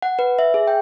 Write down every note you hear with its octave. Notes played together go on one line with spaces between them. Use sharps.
F#5
B4
E5
G#4
G5